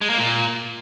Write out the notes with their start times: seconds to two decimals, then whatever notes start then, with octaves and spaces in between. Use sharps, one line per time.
0.01 G#3
0.10 A#3
0.18 A#2